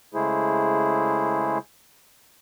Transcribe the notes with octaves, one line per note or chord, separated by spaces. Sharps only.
C#3 G#3 A3 E4 G#4 C5